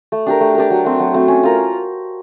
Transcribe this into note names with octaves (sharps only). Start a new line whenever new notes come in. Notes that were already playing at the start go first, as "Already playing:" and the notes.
A3
D4 G4 A#4
A3
D4 G4 A#4
F#3
A3 C4
F#3
A3 C4
C#4
F4 A#4